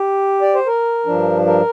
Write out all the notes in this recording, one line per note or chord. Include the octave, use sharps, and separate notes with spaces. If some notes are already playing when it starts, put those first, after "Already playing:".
Already playing: G4
D5
C5
A#4
G2 F3 D4
A#4